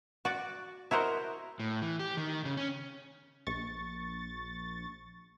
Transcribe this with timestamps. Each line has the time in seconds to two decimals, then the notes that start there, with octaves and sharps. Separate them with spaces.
0.25 F#4 D5
0.91 E4 F#4 A#4 C5 D#5
1.60 A2
1.82 E3
2.00 G4
2.17 D#3
2.45 C#3
2.57 C#4
3.47 A#1 C#6 A6